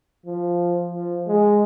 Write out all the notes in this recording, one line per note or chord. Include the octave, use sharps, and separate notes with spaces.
F3
F3
G#3